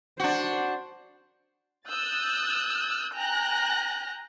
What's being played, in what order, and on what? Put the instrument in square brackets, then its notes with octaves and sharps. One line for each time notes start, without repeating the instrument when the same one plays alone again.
[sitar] D4 F#4 [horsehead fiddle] C5
[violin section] D#6 E6 F#6 G6 A6
G5 G#5 A#5 F#6 G6 A#6